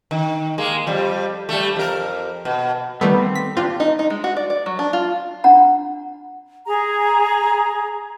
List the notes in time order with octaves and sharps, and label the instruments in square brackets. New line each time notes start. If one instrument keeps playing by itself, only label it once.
[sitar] D#3
G#3 A#3
F2 G3
G3 A3
F2 A#4
B2
[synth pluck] D#3 G3 A3 [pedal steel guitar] B3
[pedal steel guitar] C4
[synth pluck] B6
[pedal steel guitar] C4 D4 G4 [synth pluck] F4
[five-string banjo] D#4
D#4
G#3
F#4
D5
D5
F#3
D4
F4
[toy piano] D4 F#5 A#5
[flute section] G#4 A#5